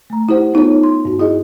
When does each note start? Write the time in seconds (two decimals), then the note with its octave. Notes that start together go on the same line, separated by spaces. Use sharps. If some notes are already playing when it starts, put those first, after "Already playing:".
0.10 A3 A#5
0.29 E4 G4 C5 F#5
0.54 B3 D#4 F4 A4 C#5
0.83 C6
1.05 G2 F#4
1.19 E4 G#4 D#5